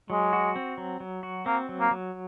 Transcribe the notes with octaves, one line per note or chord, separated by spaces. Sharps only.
F#3 G#3
F#4
C4
F#3
F#3
F#4
A#3 C4
F#3
A#3
F#3